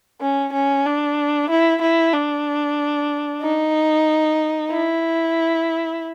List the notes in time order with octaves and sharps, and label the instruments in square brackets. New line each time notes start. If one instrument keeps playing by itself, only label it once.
[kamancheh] C#4
C#4
D4
E4
E4
D4
D#4
E4